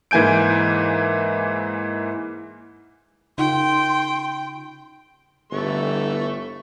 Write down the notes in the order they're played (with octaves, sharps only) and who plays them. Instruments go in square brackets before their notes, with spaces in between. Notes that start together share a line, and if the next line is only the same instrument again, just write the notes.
[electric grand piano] G#2 E3 A#3 G#5 G6 D7
[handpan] C#3 D#4 F4 [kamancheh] G5 [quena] C6
[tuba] G1 [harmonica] E3 A3 C#6